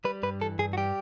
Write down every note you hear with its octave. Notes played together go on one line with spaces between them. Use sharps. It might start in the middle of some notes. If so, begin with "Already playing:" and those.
G3 B4
G2 B4
E3 A4
G2 G#4
F#4
G3 G4